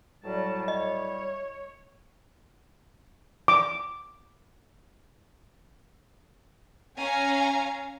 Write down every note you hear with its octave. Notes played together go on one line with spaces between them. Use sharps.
A2 F#3 G3 A5
C#5 D#5
D6
C#4 C#5 F5 G#5 A#5